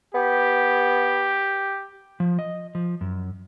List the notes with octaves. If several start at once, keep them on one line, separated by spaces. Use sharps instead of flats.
B3 G4
F3
D#5
F3
F#2